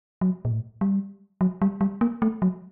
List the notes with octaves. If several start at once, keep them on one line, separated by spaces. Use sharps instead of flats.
F#3
A#2
A2
G3
F#3
G3
G3
A#3
A3
F#3